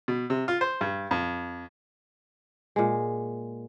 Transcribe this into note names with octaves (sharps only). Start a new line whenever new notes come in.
B2
C3
F4
C5
G2
F2
A#2 G#3